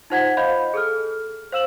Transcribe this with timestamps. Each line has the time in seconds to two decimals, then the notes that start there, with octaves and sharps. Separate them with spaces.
0.10 D#4 F4 C5 F#5 G#6 B6
0.37 C5 D#5 F5 B5 G6
0.74 G#4 A4 F6
1.52 C5 F5 E6 E7 F#7